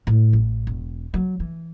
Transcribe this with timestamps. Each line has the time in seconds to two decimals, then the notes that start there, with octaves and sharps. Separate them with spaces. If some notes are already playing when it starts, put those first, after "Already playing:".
0.07 A2
0.33 A1
0.67 E1
1.14 F#3
1.40 E3